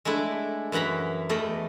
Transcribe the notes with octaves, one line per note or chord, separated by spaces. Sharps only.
G#3 A3 D4 E4
F#2 E3 F#5 A#5 B5
E2 A3 D5 D#5